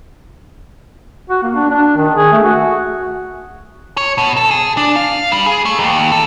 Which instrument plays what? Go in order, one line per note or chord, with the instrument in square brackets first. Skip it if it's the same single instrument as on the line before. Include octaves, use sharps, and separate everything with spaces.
[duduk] F#4
A#3
D4
D4
D#3
G#4
A3
F#4
[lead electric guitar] C#5
B2
A4
G#4
D4
F5
G3
G#4
A3
D#2
A4